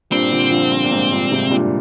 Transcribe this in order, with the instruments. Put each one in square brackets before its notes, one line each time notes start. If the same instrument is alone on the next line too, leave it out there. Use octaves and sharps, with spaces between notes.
[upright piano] G2 A#2 [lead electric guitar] C4
[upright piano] A#2 D3
D3 F3
G2
A#2
G#2
G2 A#2
G#2 C3
G2 A#2